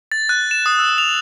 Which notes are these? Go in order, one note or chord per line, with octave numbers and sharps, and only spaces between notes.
A6
F#6
E7
D#6
E6
F7